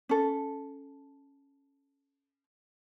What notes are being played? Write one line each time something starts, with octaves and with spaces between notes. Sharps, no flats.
C#4 A4